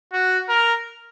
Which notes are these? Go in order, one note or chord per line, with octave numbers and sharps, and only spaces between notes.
F#4
A#4